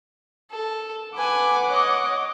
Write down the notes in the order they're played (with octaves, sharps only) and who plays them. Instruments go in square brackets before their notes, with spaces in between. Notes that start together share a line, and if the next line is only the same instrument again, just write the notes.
[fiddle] A4
[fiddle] B4 G#5 [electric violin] F#5 D6
[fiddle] C#5 D#5